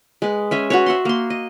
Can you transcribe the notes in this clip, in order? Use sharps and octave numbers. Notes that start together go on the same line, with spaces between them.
G#3 B4
C#4 E5 G#5
F#4 B4 C#5
E5 F#5 C6
A#3 C6
D#5